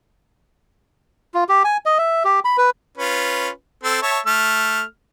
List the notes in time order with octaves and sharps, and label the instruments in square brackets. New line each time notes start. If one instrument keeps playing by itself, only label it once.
[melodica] F4
G4
G#5
D#5
E5
G4
B5
B4
[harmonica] C#4 F4 B4
C4 A4
C#5 E5 A5
A3 F6